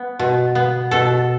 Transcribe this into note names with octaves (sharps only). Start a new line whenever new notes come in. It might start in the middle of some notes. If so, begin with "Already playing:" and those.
Already playing: B3
B2
B3
B2 A4